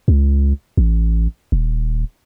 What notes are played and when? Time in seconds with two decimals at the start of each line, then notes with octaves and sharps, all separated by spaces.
0.08 C#2
0.77 A1
1.52 D#1